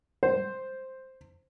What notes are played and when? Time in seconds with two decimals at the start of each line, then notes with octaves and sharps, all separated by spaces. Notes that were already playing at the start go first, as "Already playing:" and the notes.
0.23 C5